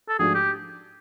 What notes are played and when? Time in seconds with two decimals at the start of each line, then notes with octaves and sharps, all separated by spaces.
0.09 A4
0.19 G#2 F3 A3 D4 F#4 G#4
0.35 G4